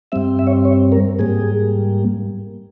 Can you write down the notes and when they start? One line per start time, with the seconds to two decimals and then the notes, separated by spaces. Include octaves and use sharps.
0.12 G2 G3 C4 E5
0.39 E5
0.47 C#5
0.65 C#5
0.92 A#4
1.19 G#2 G3 A#3 G#4